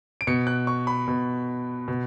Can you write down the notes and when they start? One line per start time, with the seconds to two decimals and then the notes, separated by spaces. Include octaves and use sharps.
0.21 D7
0.27 B2 C#7
0.47 F#6
0.67 C#6
0.87 B5
1.08 B2
1.88 B2